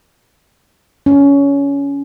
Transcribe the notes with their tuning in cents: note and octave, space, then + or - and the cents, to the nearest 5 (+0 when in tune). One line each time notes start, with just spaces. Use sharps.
C#4 +20